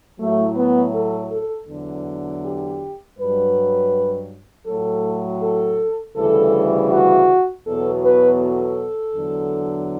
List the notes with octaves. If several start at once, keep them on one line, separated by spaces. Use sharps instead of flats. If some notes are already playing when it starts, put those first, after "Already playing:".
A2 F#3 A3
B3
A4
A4
E2 D3 F#3
G4
G2 F#3 B4
A2 F#3 A4
A4
D2 C#3 E3 G3 A4
F#4
E2 B2 F#3 A4
B4
A4
E2 D3 F#3